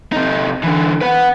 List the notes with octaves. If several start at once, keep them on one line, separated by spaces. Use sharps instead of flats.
C3 D#4
D3 E3
B4 F#5